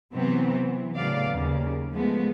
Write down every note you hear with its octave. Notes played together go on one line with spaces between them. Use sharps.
C3 E3 F#3 B3 C4
E3
A2 C#3 F#3 B3 D5 F5
D#2 C#3
F3 G#3 A3 B3